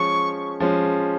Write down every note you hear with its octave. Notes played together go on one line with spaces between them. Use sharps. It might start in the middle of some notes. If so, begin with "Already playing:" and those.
Already playing: F3 G#3 C#4 C#6
F3 G#3 C#4